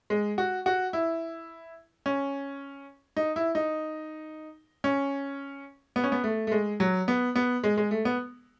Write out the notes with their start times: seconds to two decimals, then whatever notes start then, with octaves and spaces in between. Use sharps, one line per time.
0.10 G#3
0.38 F#4
0.66 F#4
0.93 E4
2.06 C#4
3.17 D#4
3.36 E4
3.55 D#4
4.84 C#4
5.96 B3
6.04 C#4
6.12 B3
6.24 A3
6.47 A3
6.52 G#3
6.80 F#3
7.08 B3
7.36 B3
7.64 G#3
7.77 G#3
7.91 A3
8.05 B3